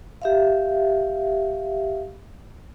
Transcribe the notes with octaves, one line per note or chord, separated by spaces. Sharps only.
G4 E5 F5